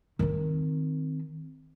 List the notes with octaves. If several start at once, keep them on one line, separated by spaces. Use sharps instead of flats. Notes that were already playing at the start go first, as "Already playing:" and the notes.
D#3 C4